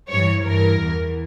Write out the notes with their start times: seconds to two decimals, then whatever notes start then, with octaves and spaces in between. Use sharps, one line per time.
0.09 G2 E3 C#5
0.44 G2 E3 A#4
0.79 E2 E3